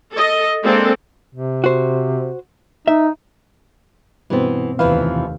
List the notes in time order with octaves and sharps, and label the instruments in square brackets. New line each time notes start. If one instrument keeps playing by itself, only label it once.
[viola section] A4 D#5
G#3 A#3 C4 D4 A4
[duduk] C3
[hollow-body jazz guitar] F#4 C5
[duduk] D#4 [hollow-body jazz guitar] E5
[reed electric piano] G2 B2 C4 [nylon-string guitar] E3 B3
[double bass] F1 D#2 [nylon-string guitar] E3 F3 [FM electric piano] B4 F5